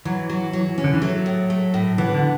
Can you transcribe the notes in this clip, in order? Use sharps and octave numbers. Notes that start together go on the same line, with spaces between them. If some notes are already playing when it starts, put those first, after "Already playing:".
E3 F#3
F#3
F#3
C#4
D3
E3
F#3 A3
A2
A3
A2
E3 B3
D3